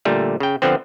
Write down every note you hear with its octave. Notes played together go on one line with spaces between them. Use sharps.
A#2 D3 G3 A3
C#3 G5
D3 F3 B3 C4